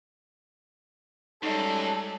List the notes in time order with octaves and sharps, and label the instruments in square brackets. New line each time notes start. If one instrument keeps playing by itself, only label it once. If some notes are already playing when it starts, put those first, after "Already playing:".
[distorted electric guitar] F#2 [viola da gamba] G3 G#3 C#4 [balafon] D#4 D#5 [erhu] A4